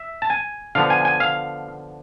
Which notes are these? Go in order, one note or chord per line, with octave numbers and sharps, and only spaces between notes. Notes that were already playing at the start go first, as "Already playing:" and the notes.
Already playing: E5
A5
G#5
D3 F3 B3 F5
G#5
G#5
F5